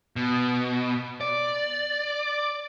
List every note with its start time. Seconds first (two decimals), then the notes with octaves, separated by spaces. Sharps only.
0.16 B2
1.21 D5